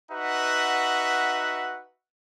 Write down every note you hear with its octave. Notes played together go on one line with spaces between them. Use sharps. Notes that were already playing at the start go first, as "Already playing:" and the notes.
D#4 F#4 B4 E5 F#5